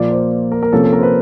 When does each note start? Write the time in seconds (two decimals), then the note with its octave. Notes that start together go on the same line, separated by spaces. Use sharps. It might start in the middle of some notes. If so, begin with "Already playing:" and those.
Already playing: A#2 F3 A#3 D5
0.11 C5
0.52 A#4
0.63 A#4
0.72 C3 F3 A#3 C#4 A4
0.83 A4
0.93 A#4
0.98 C5
1.03 B4